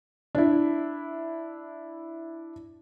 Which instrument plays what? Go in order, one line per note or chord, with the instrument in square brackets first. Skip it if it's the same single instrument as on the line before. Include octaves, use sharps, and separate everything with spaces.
[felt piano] D4 E4